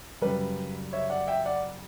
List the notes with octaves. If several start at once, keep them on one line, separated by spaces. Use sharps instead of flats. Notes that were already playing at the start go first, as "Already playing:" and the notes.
F#2 C#3 G3 B4
C#5 E5
D5 F#5
E5 G5
D5 F#5